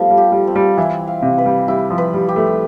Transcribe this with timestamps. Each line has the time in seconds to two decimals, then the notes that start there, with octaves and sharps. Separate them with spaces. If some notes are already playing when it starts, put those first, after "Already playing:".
Already playing: F3 G3 A3 B3
0.10 G3
0.18 G4
0.32 G3
0.47 C4
0.56 G3
0.78 E3 E4
1.07 F5
1.22 C3
1.38 B4
1.46 G3
1.68 G3 E4
1.90 F3
1.98 B4
2.14 G3
2.29 G4
2.36 A3